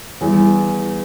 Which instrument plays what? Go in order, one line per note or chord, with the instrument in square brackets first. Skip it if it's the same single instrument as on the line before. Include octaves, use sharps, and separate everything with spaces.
[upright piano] E2 [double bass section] G3